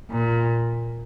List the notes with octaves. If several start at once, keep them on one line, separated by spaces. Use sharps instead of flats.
A#2